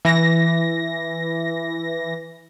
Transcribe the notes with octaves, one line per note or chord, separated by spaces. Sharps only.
E3 A#6